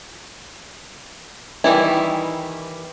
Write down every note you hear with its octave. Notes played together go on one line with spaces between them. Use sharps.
D#3 E3 G3 E4